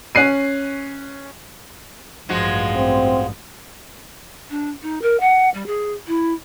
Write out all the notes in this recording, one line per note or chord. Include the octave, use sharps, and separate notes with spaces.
C#4 F#6 C7 D#7
A1 G2 F3 G#3 F#4
C4
D4
D#4
A#4
F#5
G3
G#4
E4